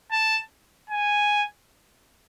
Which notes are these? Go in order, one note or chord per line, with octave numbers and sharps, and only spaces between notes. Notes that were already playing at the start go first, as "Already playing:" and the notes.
A5
G#5